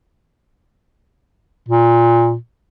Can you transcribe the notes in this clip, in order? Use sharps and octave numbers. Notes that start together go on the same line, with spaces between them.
A#2